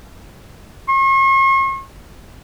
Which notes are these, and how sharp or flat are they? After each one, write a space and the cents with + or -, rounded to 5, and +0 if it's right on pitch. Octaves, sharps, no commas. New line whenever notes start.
C#6 -45